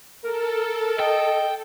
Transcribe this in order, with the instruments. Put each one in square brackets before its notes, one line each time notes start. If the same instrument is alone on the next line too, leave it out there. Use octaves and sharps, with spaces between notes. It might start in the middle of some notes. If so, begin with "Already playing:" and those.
[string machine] A4 [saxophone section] A#4
[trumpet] D#5 [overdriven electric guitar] G5